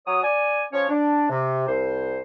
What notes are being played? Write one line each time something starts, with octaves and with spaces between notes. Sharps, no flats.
F#3 C#5 D#6
D5 G#5
F3 C#4 C#5
D4
C3
C2 C5